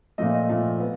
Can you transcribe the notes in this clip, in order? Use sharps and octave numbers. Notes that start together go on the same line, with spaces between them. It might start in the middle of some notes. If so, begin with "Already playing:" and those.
A#2 F3 A3 D#5
D#5
A#2 F3 A3
B3